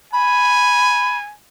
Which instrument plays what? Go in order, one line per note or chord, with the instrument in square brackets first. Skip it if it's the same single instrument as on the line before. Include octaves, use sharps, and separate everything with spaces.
[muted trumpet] G#5 [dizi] B5